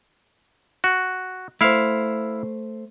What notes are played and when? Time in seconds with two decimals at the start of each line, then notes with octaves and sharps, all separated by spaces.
0.84 F#4
1.61 A3 E4 C5 F5